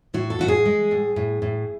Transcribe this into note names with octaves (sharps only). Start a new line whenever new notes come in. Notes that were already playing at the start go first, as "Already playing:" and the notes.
A2 F#4
A4
A2 F#4
G#4
G#3
A2
A2
A2